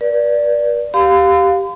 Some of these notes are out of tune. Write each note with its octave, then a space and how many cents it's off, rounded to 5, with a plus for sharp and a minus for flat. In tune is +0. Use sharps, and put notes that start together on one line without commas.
B4 -45 D5 +0
G4 -5 F5 +10 C6 -45